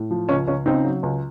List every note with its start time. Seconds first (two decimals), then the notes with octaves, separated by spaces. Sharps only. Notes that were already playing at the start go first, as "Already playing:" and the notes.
Already playing: A2
0.11 F3
0.29 C#2 C#4
0.47 C#2 C#4
0.66 C#3 C4 D#4
0.85 F#3
1.03 C#2